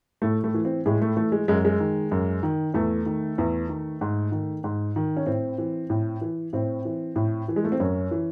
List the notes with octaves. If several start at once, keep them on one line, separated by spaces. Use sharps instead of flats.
A2 A3
A3
E3
C4
A2 G#3
A3
E3 A3
G#3
F#2 G#3
G#3
D#3
F#2
D#3
E2 A3
D#3
E2
D#3
G#2
D#3
G#2
D#3
C#4
A2 C4
E3
A2
E3
A2 C4
E3
A2
E3
G#3
A3
C4
F#2 C#4
E3